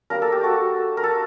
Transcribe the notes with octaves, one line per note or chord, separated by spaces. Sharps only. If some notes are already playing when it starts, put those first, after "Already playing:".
G3 A#3 D4 A#4
A4
G4
F#4 A4
A#4
A4